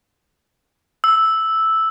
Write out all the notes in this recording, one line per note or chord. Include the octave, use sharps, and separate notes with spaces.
E6